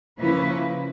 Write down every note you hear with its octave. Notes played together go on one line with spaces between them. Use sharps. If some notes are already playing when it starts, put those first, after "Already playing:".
C#3 F3 A#3 C#4 E4 B4